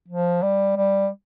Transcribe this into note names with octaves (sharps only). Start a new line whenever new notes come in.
F3
G3
G3